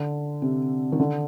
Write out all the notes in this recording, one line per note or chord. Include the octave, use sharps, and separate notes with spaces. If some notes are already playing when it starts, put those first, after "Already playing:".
Already playing: D3
C3
D#3
D3